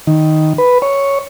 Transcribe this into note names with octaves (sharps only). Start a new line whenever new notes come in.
D#3
B4
C#5